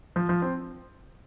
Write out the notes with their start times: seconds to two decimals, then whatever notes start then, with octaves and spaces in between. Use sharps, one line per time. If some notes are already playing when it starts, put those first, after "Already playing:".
0.16 F3
0.29 F3
0.42 C4